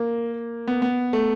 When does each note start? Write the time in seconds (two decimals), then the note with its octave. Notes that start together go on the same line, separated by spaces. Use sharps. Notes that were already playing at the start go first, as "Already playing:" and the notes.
Already playing: A#3
0.67 B3
0.82 B3
1.13 A3